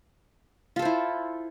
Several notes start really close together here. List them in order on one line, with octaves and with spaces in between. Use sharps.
F4 A4 C5 E4